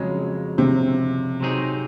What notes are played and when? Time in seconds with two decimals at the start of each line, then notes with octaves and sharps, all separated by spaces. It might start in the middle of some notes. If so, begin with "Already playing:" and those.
Already playing: F2 C#3 F#3 G#3
0.58 C3
1.40 C3 F#3 C4 D#4 G#4